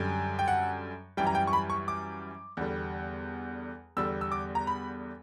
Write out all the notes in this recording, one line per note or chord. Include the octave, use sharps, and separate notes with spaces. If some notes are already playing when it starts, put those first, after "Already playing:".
Already playing: F#2 D3 G3
G5
F#5
F#2 E3 G3 G5
A#5
G5
C#6
B5
C#6
D6
E2 D3 G3
E2 D3 G3 E6
E6
D6
A#5
B5